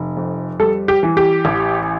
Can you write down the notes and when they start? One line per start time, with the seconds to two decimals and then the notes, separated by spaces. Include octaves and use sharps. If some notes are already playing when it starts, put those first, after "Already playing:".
Already playing: F1
0.17 F2
0.60 G3 A4
0.88 G4
1.03 E3
1.17 G4
1.45 A1